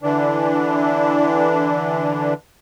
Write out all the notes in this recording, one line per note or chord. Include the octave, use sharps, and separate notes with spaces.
D3 E3 D4